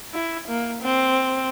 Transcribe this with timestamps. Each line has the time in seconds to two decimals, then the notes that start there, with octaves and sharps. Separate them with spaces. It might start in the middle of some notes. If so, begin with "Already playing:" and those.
0.14 E4
0.48 A#3
0.82 C4